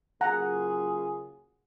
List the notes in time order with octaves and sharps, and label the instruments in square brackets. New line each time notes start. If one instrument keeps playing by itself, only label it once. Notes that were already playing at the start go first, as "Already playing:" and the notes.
[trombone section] C#3 F#3 A#3 F4 G#4 [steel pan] F#5 A#5